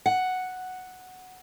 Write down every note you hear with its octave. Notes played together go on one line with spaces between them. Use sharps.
F#5